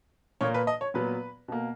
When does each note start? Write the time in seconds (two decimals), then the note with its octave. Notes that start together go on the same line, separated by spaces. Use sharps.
0.41 A#2 A#3 C#5
0.54 B4
0.67 D#5
0.81 C#5
0.94 A#2 F#3 B3 B4
1.48 B2 A#3